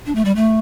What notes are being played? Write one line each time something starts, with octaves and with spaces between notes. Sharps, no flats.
D4
A3
G3
A3